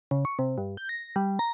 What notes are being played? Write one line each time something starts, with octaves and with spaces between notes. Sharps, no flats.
C#3
C#6
C3
G2
G6
A#6
G3
A#5